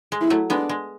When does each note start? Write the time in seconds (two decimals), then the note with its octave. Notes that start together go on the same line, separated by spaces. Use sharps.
0.12 G#3
0.21 E4
0.30 F#3 A3
0.50 G#3 B3 D4
0.69 G#3